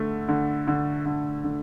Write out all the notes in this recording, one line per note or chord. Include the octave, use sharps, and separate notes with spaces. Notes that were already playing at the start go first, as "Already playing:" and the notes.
Already playing: D3 A3
D3
D3
D3
D3